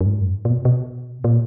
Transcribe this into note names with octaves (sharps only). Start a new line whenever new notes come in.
F#2
G#2
F#2
A#2
B2
B2
A#2